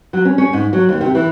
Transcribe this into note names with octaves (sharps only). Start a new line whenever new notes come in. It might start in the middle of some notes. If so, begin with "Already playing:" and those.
F#3
C#4
C#4
G#2
F#3
D#2
C3
E3